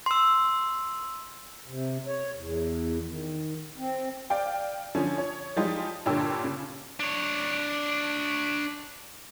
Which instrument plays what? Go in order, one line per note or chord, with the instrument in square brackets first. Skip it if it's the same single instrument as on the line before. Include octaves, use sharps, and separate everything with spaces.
[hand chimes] C6 E6
[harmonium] C3
C#5
E2
D#3
C4
[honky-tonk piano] D5 F5 G5
D3 F3 C#4
C#5
F3 G3 G#3 D#4 F4 G4
G2 A#2 D3 C#5 G5 E6
C#3
[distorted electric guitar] D4 C#5